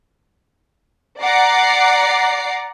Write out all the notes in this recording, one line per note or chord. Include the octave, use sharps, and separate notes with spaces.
D5 F#5 A#5 D6 C7